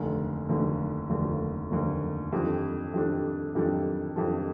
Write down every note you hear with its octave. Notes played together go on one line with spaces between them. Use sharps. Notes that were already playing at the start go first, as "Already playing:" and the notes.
Already playing: F1 D#2 D3
F1 D#2 D3
F1 D#2 D3
F1 D#2 D3
F2 D#3 G3 D4 A4
F2 D#3 G3 D4 A4
F2 D#3 G3 D4 A4
F2 D#3 G3 D4 A4